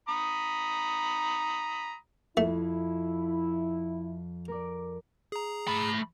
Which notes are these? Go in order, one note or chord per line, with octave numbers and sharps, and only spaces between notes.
A#5 B5 D#6
F2 A3 E4
A#4 D5
G#4 A#5
A3 B5